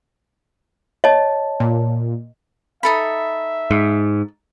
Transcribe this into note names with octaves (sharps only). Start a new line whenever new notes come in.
C#5 D#5 A5
A#2
D#4 A4 E5 B5
G#2